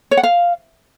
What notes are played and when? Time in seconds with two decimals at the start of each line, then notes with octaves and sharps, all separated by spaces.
0.11 C#5
0.17 F#5
0.23 F5